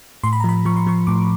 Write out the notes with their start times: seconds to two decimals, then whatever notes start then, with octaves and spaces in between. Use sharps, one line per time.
0.24 A2 C6
0.33 B5
0.40 A#5
0.44 F3 B5
0.65 F3 C#6
0.77 C6
0.87 F3 C#6
1.07 A2 D6